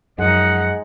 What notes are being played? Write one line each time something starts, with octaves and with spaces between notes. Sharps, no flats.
F#2 F3 G#3 D#4 F#5